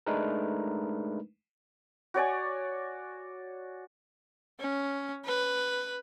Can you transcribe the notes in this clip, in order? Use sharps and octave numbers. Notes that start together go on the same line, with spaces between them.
G#3 A3 D4 D#4 A#4 B4
F#4 C#5 D5 G#5
C#4
B4